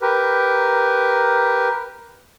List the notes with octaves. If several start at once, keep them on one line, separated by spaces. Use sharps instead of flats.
G4 A#4 B4